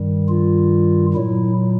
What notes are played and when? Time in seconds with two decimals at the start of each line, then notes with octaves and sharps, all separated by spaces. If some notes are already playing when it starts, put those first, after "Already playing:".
Already playing: G2 D#3 G3
0.29 F4
1.14 A#2 F#3 E4